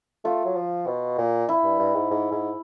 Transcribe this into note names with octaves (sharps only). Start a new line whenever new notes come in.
A3 F4
F#3
F3
B2
A#2
E4
G2
G2
G#2
G#2
G#2